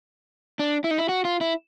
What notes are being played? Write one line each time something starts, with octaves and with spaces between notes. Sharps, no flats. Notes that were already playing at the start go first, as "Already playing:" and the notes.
D4
E4
D#4
E4
F#4
F4
E4